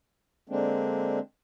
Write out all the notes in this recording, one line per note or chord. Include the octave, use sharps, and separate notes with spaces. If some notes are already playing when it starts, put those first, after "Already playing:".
D3 G#3 A#3 C4 D4